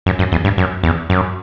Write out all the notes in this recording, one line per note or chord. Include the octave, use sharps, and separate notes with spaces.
F#2
F#2
E2
G2
F#2
E2
F#2